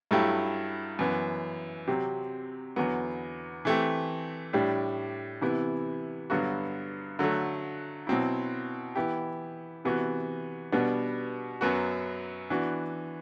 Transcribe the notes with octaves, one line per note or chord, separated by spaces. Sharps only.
G2 F#3 A3 E4 G4
F#2 E3 B3
C3 F#3 C4 G4
E2 D3 F#3 B3
E3 A3 C4 G4
A2 G3 D4 G4
C3 E3 B3 E4
G2 D3 F#3 B3 F#4
D3 F#3 A3
B2 F#3 C4 E4
E3 B3 E4 G4
C3 E3 B3 F#4
B2 G3 B3 D4
F#2 F#3 B3 F#4
E3 B3 D4 F#4